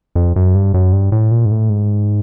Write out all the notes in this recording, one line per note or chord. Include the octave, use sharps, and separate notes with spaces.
F2
F#2
G2
F#2
G2
A2
A#2
G#2
A2
G#2